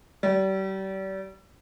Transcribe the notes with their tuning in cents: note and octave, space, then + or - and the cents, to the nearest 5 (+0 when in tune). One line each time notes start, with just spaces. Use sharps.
G3 -35